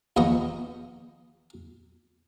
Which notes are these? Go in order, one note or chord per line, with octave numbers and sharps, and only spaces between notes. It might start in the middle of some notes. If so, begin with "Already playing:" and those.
D#2 F3 B3 D#5 C#6